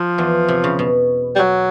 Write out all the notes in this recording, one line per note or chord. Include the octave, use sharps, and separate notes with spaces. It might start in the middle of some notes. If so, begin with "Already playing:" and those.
Already playing: F3
E2 E3
C3
C#3
B2
G3
F#3